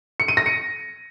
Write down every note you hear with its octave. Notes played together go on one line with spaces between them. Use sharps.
C#7
D#7
A#6
C#7